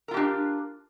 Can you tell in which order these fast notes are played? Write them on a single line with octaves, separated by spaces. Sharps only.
A#4 F4 G4 D4